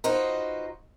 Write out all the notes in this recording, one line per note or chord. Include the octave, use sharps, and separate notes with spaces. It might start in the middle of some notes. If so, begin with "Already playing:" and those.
D#4 F4 F#4 B4 C5 D#5